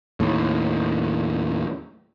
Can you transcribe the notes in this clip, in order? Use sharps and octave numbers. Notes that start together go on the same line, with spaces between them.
D#2 A2